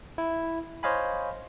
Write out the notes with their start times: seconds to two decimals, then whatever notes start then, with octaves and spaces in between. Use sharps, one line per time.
0.18 E4
0.83 C5 C#5 D#5 F5 G#5 B5